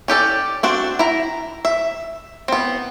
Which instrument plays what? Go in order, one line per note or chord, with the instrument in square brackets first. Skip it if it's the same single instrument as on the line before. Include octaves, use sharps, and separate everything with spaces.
[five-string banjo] C#4 G4 A4 D5
C4 D4 F#4
E4 A#5
E5
B3 C4